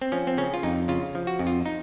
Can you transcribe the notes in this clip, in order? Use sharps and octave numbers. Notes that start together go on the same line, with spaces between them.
C4
F3 C#4
C4
C#3 C#4
F4
F2 D#4
C#3 F4
F3
F#4
F2
F4
D#4